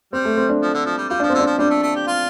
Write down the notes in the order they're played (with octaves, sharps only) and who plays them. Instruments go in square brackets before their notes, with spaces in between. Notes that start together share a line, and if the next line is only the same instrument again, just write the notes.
[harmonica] G3 [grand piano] C4
[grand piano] A3
C4
D4
[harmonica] F3
D3
F3
G3
[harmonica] G3 [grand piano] F4
[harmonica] F3 [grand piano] D4
[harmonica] D3 [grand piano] C4
[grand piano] D4
[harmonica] F3
[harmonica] G3 [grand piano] D4
[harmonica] A3
A3
G4
F4